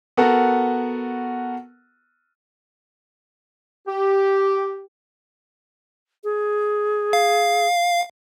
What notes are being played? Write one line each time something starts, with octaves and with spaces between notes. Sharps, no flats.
B3 F#4 A4 A#4 F#5
G4
G#4
F5